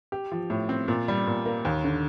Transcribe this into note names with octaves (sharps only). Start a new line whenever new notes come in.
G4
F3
A2
C4
A#2
G3
A#2
A#3
D#2
D3